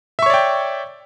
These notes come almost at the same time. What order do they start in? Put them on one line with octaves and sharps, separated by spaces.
E5 C#6 C#5 D5 G5